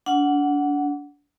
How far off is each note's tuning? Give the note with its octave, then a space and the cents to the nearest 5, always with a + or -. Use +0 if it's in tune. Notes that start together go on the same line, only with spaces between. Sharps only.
D4 -30 F#5 +0